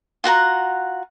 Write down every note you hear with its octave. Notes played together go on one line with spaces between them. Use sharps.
F4 F#4 F#5 A#5